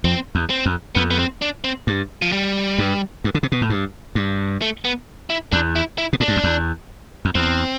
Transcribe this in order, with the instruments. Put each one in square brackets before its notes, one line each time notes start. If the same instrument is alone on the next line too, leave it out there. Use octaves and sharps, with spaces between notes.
[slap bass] F2 [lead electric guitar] C4
[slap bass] E2
[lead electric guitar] C4
[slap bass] F2
[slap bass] F2 [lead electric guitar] B3
[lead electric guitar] B3
C4
D4
C4
[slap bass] G2
[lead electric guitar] F3
G3
[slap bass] G2
G2
D3
C3
B2
A2
G2
G2
[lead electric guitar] A3
B3
E4
[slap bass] E2 [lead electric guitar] D4
[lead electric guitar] E4
E4
[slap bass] B2
[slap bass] A2 [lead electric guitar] D4
[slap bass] G2
F2
E2
F2
[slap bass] E2 [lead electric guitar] C4